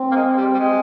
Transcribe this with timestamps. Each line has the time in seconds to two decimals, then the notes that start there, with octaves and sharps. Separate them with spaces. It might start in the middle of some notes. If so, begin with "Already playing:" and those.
Already playing: C4
0.11 A#3
0.15 G#3
0.37 G3
0.54 G3
0.59 G#3